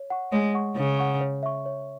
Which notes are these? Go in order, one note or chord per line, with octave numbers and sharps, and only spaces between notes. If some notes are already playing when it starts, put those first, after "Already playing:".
Already playing: C#5
F#5 C#6
G#3 C#5
F#5 C#6
C#3 C#5
F#5 C#6
C#5
E5 C#6
C#5